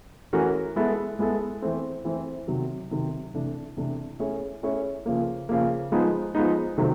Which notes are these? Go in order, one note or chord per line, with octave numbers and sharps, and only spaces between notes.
E3 A3 C#4 F#4 A#4
G#3 B3 E4 A4
G#3 B3 E4 A4
E3 A3 C4
E3 A3 C4
C3 D#3 F#3
C3 D#3 F#3
C3 E3 A3 D4
C3 E3 A3 D4
A3 C#4 E4 G#4 C#5
A3 C#4 E4 G#4 C#5
C#3 F3 A#3
C#3 F3 A#3
F3 G#3 B3 D#4
F3 G#3 B3 D#4
C3 D#3 F#3 A3 C4